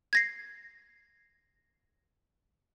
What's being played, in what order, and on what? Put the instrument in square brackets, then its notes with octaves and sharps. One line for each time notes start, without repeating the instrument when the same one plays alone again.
[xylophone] G#6 A#6 C7